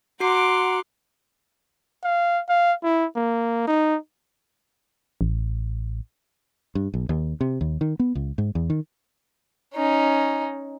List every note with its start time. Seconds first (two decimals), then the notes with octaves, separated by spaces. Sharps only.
0.20 F#4 F#5 A#5 C6 D6 F#6 C7 D7
2.04 F5
2.49 F5
2.84 E4
3.16 A#3
3.67 D#4
5.21 A1
6.75 G2
6.94 B1
7.09 D#2
7.41 C3
7.61 D#2
7.81 D#3
8.00 B3
8.15 C#2
8.38 G#2
8.55 E2
8.70 D#3
9.75 C#4 D#4